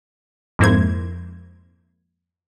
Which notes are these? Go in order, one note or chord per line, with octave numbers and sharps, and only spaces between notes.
F2 G#2 A#3 E4 C5 G#6